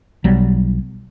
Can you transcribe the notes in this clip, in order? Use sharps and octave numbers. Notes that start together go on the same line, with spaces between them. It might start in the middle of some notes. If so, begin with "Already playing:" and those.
B1 F#3 G3